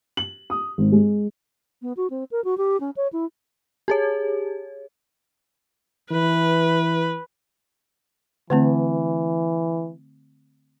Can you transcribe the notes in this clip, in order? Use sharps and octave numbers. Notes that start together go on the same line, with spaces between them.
F#7
D#6
G#1
G#3
B3
F#4
C4
A#4
F#4
G4
C#4
C#5
E4
G4 G#4 C#5
E3 B4
D3 E3 A3 C4